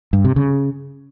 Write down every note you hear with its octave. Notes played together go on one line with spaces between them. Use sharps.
G2
C3
C#3